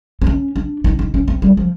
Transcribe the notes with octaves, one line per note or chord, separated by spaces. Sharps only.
C4
C#4
D4
D#4
D#4
C#4
C4
G3
F3